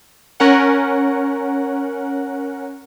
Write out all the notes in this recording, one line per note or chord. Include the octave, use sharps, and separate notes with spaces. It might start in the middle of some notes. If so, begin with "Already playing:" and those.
C#4 A#4 F#5